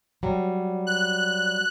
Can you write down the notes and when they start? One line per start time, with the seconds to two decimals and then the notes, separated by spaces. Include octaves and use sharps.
0.23 F#3 G3
0.87 F#6